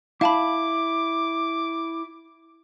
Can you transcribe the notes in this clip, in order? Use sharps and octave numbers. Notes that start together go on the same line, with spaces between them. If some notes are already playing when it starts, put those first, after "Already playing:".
E4 F5 A5 B5 D6